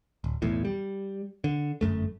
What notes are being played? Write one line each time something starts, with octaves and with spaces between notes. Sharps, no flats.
D1
B1 E2 A2
G3
D3
G1 F#2 A3